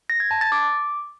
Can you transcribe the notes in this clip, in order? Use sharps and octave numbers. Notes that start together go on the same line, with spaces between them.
A#6
G#6
A5
A6
D6